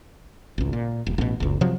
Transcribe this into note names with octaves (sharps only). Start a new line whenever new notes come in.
G#1 C#2
A#2
E1
A1 B2
F#1 C#2
C3 F3 F#3